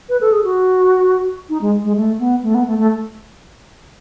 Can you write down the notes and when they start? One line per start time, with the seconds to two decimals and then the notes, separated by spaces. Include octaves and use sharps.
0.09 B4
0.21 A4
0.32 G#4
0.44 F#4
1.49 D#4
1.61 G#3
1.84 G#3
1.96 A3
2.19 B3
2.43 A3
2.55 B3
2.67 A3
2.78 A3